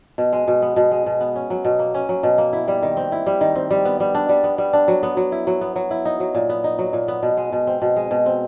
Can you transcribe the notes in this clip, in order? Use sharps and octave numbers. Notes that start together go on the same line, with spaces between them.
B2
G#3
B2
B3
B2
G#3
B2
B3
C#4
F#3
B2
A#3
C#4
F#3
B2
A#3
E4
G3
D#3
C4
E4
G3
D#3
C4
G3
B3
G3
D4
G3
B3
G3
D4
F#3
B3
F#3
E4
F#3
B3
F#3
E4
D#4
F#3
A#2
B3
D#4
F#3
A#2
B3
B2
G#3
B2
C4
B2
G#3
B2
C4